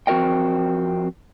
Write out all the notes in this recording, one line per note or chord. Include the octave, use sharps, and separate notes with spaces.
F2 C4 F#4 A#4 D#5 G5